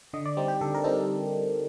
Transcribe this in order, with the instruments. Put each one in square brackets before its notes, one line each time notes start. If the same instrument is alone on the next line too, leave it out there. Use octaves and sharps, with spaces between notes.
[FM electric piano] D3 D#5
D5
G3 C4 D#4 G4
G4
D3 A4
A#4
G3 C4 D#4 A4